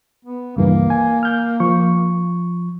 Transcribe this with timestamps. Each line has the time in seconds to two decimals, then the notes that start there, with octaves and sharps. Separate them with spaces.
0.25 B3
0.56 C#2 G2 E3 A#3
0.90 G#5
1.23 F6 G6
1.60 F3 C#6